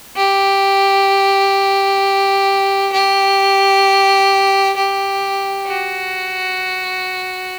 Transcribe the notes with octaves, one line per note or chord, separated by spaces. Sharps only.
G4
G4
G4
F#4